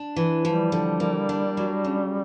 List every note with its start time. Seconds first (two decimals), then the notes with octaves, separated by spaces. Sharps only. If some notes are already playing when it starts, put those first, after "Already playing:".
Already playing: D4
0.16 E3
0.44 F3 G3
0.72 D3
1.00 A#3
1.29 D4
1.57 F#3
1.85 C#3